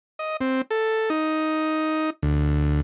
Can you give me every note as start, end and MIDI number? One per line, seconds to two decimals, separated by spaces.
0.19 0.37 75
0.41 0.61 60
0.71 1.09 69
1.10 2.10 63
2.23 2.81 38